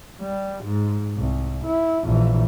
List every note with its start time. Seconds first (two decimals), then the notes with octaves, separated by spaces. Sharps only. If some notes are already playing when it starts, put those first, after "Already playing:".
0.21 G3
0.64 G#2
1.17 C2
1.65 E4
2.04 A#1 E3